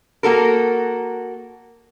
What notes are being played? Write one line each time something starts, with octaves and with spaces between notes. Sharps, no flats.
A#3 F#4 A4 A#4